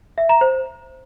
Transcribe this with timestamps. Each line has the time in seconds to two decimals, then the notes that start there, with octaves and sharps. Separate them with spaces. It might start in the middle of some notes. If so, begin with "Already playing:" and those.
0.18 E5
0.29 A#5
0.41 C5